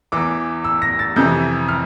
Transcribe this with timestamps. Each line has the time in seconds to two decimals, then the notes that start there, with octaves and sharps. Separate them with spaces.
0.12 E2 E3 D6
0.64 E6
0.82 A#6
0.99 A6
1.16 F2 C3 E3 G6
1.68 F6